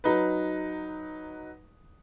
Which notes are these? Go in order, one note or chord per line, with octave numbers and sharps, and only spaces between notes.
F#3 D#4 B4